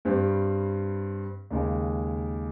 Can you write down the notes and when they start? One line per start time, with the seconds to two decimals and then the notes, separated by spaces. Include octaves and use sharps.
0.05 G2 G3 C4
1.50 D#2 C#3 G#3